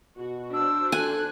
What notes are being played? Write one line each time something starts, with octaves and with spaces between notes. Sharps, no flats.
B2 F#4
D4 F#4 C5 E6
A4 G#5 F#6